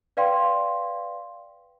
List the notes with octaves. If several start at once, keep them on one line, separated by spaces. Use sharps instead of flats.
B4 D5 F5 G5 C6